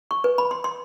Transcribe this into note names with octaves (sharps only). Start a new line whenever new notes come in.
C#6
B4
B5
C6
C6